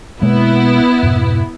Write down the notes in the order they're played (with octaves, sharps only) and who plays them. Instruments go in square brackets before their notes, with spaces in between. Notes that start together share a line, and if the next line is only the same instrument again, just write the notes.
[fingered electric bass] B2 G#3 A#3 [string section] B3 E4
[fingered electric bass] F2 G#2 B2